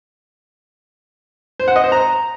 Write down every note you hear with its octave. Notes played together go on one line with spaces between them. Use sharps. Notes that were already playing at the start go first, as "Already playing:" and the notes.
C5
F#5
D#5
C5
A#5